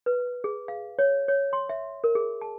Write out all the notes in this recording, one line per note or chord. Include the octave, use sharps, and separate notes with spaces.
B4
G#4
F5
C#5
C#5
C6
E5
A#4
G#4
A5